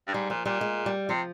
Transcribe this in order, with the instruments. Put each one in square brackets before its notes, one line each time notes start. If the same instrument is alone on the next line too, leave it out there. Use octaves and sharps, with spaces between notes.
[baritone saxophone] G2
[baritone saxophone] G#2 [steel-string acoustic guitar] G3
[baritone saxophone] A#2 [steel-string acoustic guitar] F3
[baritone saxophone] A#2 [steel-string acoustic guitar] G3
[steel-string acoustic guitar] G#3
G3
[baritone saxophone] C3 [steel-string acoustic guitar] F3